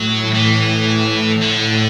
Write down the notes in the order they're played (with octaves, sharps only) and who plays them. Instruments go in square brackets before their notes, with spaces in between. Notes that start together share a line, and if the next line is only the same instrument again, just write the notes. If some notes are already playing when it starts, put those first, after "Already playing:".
Already playing: [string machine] A2 [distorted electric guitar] F#3
[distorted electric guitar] E3
[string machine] A2 [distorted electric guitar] D3